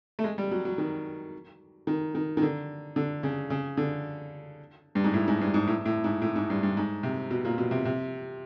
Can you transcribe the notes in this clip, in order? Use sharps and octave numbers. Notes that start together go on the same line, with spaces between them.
A3
G#3
G3
F#3
F#3
D#3
D#3
D#3
D#3
D3
D3
C#3
C#3
D3
G2
G#2
A2
G#2
G2
G#2
A2
A2
G#2
A2
G#2
G2
G2
G#2
C3
B2
A#2
B2
C3
C3